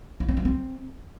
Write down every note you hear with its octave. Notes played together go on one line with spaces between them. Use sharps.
E4
C4
G3
C4